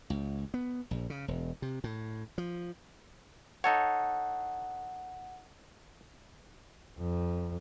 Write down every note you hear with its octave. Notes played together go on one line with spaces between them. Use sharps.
C#2
B3
A#1
C#3
E1
C3
A2
F3
D#4 A4 C#5 F#5
F2